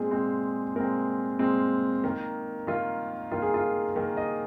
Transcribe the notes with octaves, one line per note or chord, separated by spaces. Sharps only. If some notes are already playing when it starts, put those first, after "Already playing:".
Already playing: A#2 G#3 C4 G#4
A#2 G#3 C4
A#2 G#3 C4 A#4
A#2 G#3 C4
D#3 A#3
D#3 A#3 F4
D#3 A#3 F4
G#4
F4
D#3 A#3 A#4
D#5